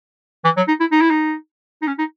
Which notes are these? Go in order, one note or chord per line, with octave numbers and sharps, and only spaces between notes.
E3
F#3
D#4
E4
D#4
E4
D#4
D#4
C#4
D#4